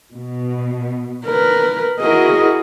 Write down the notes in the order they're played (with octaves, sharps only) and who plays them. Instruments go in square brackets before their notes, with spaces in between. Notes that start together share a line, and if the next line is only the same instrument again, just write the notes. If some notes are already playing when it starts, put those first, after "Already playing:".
[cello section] B2
[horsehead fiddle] A#4 B4
[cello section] E4 F#4 G#4 [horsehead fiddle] A#4 D#5